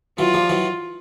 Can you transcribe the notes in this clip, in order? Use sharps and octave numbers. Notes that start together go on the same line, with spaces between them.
E3 F#3 F4
F3 G3
E3 F#3